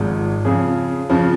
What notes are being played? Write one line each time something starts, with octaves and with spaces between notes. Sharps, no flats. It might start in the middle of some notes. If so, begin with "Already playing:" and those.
Already playing: G#1 G#2 F3
F2 C#3 F3 G#4
F2 C#3 F3